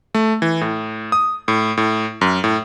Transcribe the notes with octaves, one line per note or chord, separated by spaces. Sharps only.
A3
E3
A2
D#6
A2
A2
F#2
A2